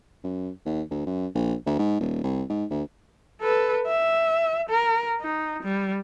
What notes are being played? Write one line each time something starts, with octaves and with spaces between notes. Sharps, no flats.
F#2
D#2
D2
F#2
A#1
D2
G#2
D#1
C2
G#2
D2
A4 B4
E5
A#4
D#4
G3